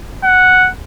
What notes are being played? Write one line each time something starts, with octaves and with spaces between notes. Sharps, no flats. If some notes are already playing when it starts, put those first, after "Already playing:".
F#5